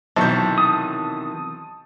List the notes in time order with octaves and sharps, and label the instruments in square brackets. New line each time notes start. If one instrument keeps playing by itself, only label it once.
[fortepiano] B1 [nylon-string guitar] C3 D#3 E3 [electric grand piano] A5 C#6 G6
[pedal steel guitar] D#6